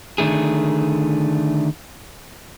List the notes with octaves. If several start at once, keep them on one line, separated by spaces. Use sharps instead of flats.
D3 D#3 A3 G#4